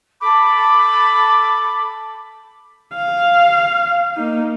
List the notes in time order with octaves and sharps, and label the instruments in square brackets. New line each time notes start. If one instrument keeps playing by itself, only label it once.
[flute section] A4 B5 D6
[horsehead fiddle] F5
A#3 D#4